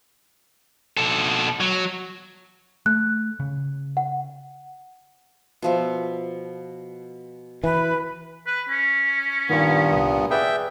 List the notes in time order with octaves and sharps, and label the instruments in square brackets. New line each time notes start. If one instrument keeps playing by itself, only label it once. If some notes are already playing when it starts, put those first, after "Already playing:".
[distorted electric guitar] B2 A4
F#3
[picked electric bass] A3 [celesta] F#6
[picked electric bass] C#3
[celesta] F#5
[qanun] B2 F3 E5
[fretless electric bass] E3 [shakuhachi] B4
[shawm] B4
C#4
[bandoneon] G2 A#2 B3 [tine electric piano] D#3 C#6
[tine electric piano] C2 D#6
[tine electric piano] G#4 B4 D5 [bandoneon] E5 G5